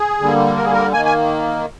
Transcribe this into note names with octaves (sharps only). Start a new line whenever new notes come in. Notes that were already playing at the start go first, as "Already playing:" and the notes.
Already playing: G#4
D3 G3 A#3
A#4
G#4
A#4
D#3 A#3 G#5
G#5